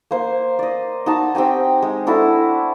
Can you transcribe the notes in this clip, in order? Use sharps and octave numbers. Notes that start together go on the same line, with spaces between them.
A#3 C5
D5 D#5
D#4 F#4 D#5 A5
C4 G4 G5 G#5
G#3
D4 E4 F#4 A4